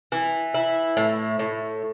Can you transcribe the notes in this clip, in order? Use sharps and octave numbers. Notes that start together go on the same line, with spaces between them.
E3
E4
A2
A2